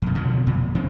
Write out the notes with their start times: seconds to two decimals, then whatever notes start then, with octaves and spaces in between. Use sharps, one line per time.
0.02 F2 B2
0.15 B2 D3 F3 F#3
0.46 F2 A#2
0.75 C#3 C4